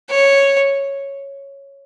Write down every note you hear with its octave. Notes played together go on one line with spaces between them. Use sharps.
C#5